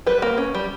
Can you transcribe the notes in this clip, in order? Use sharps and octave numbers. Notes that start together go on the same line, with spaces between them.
G3 B4
A#3
C#4
G3